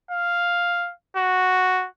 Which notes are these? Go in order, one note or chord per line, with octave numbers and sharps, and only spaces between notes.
F5
F#4